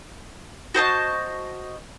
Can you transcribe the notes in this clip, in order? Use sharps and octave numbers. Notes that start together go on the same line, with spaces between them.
F#4 C5 D#5 A5